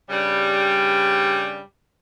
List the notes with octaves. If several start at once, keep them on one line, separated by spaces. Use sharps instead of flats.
G2 C#3 G3